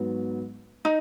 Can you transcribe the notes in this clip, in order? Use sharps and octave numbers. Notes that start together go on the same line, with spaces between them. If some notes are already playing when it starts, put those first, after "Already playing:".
Already playing: G#2 F#3 B3
D#4